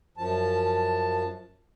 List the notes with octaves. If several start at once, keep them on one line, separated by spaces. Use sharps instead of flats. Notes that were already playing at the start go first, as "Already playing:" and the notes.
F#2 F3 A5